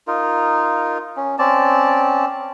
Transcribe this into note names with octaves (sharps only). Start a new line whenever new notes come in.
D#4 F4 A#4
C#4
C4 C#4 D5 A5